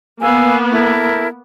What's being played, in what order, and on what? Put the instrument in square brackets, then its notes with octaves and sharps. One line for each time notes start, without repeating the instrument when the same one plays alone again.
[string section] A#3 B3 [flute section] F5 G#5 E6
[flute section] E4 A4 A#4